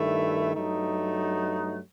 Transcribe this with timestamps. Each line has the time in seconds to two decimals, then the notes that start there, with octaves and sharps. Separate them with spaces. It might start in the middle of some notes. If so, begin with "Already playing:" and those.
Already playing: G2 D#3 A3 E4
0.54 G2 F#3 A3 D#4